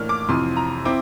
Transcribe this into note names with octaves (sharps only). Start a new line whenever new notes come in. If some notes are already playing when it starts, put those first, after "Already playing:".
Already playing: A2 E3 A#3 D4 F6
D6
F2 C3 E3 C6
A#5
C4 E4 D6